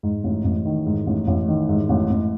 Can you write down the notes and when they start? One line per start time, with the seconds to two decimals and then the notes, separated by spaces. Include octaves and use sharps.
0.03 G#2
0.24 A1
0.44 A1
0.65 D#3
0.86 G#2
1.07 A1
1.27 A1
1.48 D#3
1.69 G#2
1.89 A1
2.10 A1